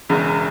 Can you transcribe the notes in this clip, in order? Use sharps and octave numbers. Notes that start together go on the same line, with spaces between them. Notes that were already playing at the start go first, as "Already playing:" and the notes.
E1 E2 C#3